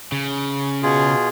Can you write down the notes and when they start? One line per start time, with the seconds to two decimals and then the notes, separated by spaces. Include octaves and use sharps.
0.12 C#3
0.83 B2 F4 G#4